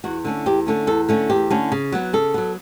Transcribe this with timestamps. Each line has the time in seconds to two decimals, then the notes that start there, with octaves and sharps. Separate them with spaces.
0.04 E2 F#4
0.25 D3 A3 C#4
0.46 E2 G4
0.67 D3 A3 C#4
0.87 E2 A4
1.09 D3 A3 C#4
1.30 E2 G4
1.50 D3 A3 C#4
1.72 C#3
1.92 F#3 B3
2.13 C#3 A4
2.34 F#3 B3